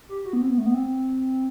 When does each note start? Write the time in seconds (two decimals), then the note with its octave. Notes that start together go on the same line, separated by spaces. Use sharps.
0.09 G4
0.25 F#4
0.33 B3
0.41 C4
0.50 B3
0.58 A3
0.66 B3
0.74 C4